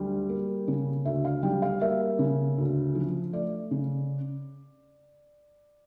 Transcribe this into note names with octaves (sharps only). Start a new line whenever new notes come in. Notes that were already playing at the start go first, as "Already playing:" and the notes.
Already playing: D2 G3 G4
A#3
C#3
D2 E5
F5
G3 G5
F5
A#3 E5
C#3
D2
F3
A3 D5
C#3